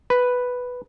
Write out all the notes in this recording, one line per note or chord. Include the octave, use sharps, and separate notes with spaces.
B4